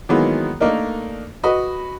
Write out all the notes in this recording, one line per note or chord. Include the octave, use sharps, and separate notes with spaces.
D#3 E3 F#3 G#3 A#3 B3
A3 A#3 D4 D#4 A#4
F#4 B4 D#5